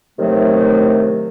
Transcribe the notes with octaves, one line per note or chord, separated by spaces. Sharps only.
A2 C3 D#3 F#3 A3